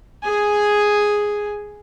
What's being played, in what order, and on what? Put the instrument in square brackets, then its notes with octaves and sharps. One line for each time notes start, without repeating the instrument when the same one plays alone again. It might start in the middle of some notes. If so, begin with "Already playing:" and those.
[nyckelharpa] G#4 G#5